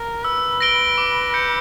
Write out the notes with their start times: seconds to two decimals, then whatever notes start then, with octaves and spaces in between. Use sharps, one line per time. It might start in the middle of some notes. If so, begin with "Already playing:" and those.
Already playing: A#4
0.24 B4 E6
0.61 A#6 D7 G7
0.98 D6
1.34 G6 C#7